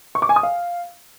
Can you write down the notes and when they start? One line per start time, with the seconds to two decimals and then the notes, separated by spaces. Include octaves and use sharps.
0.15 C#6
0.22 D6
0.29 G#5
0.36 D#6
0.43 F5